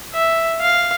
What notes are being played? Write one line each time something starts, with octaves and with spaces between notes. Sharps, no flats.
E5
F5